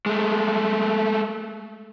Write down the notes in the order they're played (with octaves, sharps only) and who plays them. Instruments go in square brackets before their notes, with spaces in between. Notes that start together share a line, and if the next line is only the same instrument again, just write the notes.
[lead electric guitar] G#3 A3